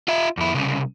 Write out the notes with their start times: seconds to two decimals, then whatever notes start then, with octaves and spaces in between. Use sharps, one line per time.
0.08 F4 E5
0.37 F2 E4
0.54 C2 C#3